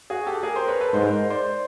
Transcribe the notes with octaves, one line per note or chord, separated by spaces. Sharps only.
F#4 G#4
G4 A4
G#4 A#4
A#4 C5
B4 C#5
A4 B4
G#2 A#4 C5
A#4 C5
C5 D5